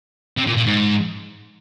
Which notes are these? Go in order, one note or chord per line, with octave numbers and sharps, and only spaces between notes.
C3
A#2
A#2
G#2